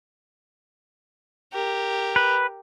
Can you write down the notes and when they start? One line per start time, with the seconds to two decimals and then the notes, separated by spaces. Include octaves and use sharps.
1.53 G4 A#4
2.16 B4